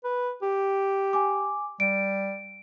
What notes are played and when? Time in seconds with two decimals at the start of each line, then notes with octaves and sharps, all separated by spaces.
0.04 B4
0.42 G4
1.13 G#5 D6
1.80 G3 D7